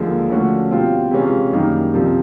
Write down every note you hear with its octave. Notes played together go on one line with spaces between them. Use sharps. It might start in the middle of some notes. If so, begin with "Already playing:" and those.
Already playing: D#2 D3 F3 G#3
D3 F3 A3 C#4 F#4
B2 G3 C4 F4
C3 E3 G#3 C#4 F4
F#2 D#3 G3 A#3 D#4
C2 C3 F3